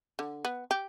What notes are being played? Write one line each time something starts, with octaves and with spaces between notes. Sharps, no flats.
D3
B3
G4